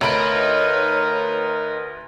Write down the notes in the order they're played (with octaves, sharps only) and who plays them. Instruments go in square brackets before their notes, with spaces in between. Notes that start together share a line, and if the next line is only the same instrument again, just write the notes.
[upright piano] D2 B5 D7 [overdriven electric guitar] D#4 [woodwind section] A#4 B4 [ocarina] C#5